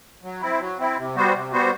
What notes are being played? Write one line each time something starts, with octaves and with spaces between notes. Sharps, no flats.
F#3
C4 E4
F#3
C4 E4
C3
G3 B3 F#4 C5
C3
G3 B3 F#4 C5